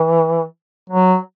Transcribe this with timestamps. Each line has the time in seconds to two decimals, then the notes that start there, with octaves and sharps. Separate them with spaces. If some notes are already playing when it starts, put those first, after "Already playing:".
Already playing: E3
0.90 F#3